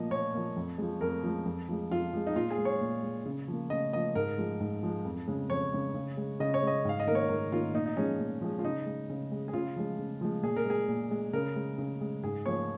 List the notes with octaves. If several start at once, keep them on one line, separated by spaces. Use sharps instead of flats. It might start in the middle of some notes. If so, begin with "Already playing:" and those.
Already playing: A#2 F3 A#3 D#5
A#2 C#5
F3 A#3
F2
F3 G#3
F2 A#4
F3 G#3
F2
F3 G#3
F2 F4
F3 G#3
D#4
A#2 F4
G#4
G#3
C#5
A#2
G#3
C#3
F3 A#3
C#3 D#5
F3 A#3 D#5
G#2 A#4
F3 G#3
G#2
F3 G#3
F2
C#3 G#3
F2 C#5
C#3 G#3
C#3
G#3
C#3 D#5
C#5
G#3 D#5
G#2 F5
D#5
D#3 A#3 A#4 C#5
G#2 A#4
D#3 A#3 F4
A#2 D#4
D#4
F3 G#3 C#4
A#2
F3 G#3
F4
C#3 D#4
G#3
C#3
G#3
G#4
C#3 F4
F3 G#3
C#3
F3 G#3
A#2 G#4
A#4
G#3 G#4
A#2
G#3
C#3 A#4
G#3
C#3
G#3
G#2 G#4
F3 A#3 C#5